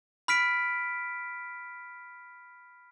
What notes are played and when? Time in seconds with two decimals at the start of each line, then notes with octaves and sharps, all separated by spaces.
0.28 B5 F6 B6 D7